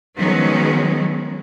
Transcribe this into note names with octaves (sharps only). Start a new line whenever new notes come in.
D#3 F3 F#3 G#3 B3 C#4